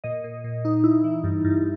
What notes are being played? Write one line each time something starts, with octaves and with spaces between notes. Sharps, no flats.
A#2 D#5
A#2
A#2
D#4
E4
E3
G2
G2